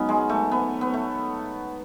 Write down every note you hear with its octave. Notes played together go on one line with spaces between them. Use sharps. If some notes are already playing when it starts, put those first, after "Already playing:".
Already playing: G#2 F#3 B3 C#4 D#4
G#3
A3
B3
B3
A3